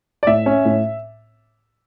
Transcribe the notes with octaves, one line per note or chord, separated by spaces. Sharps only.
D5
A2 E5
C#4
A2